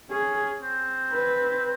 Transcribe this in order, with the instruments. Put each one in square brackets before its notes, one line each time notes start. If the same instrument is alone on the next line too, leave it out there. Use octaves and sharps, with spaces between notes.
[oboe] C#4 [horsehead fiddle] G#4
[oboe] C4
[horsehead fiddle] B4